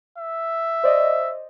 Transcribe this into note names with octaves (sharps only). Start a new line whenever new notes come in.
E5
C5 D5 D#5